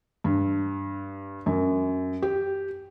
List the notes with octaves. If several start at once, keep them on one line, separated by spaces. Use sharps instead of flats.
G2
F#2
G4